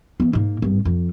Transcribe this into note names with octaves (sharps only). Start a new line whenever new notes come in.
E3 B3
G#2 A#3
G#1 G2
F2